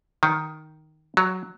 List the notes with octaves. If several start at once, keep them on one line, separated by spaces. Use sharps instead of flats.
D#3
F#3